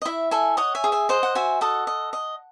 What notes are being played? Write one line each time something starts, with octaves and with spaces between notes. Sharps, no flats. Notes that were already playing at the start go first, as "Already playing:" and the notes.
D#5
E4 E5
A4 E5 G#5
C#5 D#5 F#5
E5 G#5
G#4
E5 G#5
C5 D#5 F#5
F#5
F#4 E5 G#5
A4 D#5 F#5
D#5
D#5